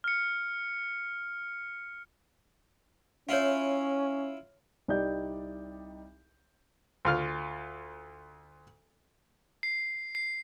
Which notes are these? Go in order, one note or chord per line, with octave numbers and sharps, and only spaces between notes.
F6 C#7
C#4 E4 F4 C#5 F5
C2 G3 D#4 D5 G6
D2 F4 F6
C7
C7